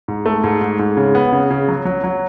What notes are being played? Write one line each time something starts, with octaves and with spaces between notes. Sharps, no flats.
G#2
A3
G#2
G#2
G#2
C#3
B3
C#3
C#3
F#3
F#3
F#3